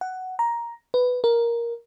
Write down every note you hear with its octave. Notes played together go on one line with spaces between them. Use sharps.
F#5
A#5
B4
A#4